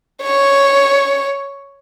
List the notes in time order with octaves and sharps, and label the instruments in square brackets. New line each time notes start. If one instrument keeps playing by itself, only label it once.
[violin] C#5